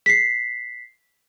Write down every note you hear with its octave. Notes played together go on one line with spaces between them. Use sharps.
B6 C7